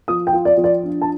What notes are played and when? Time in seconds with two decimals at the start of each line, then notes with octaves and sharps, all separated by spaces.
0.08 F3 D#6
0.27 G5
0.33 F4
0.45 D5
0.57 F3
0.64 D5
0.83 D4
1.02 A5